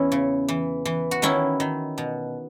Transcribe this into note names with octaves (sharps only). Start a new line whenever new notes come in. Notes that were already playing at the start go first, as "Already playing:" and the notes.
Already playing: E2 C#4 E4
C#3
E3
E3
F#4
D#3 C#4 E4
D#3
B2